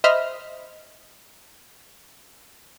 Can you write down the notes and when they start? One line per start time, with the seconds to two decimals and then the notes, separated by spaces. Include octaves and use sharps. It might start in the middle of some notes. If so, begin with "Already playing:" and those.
0.04 C5 D#5 E5 B5 F6